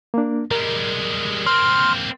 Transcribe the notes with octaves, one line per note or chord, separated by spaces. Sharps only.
A#3 D4
G3 G#3 A#4
A#3 C4 C6 F6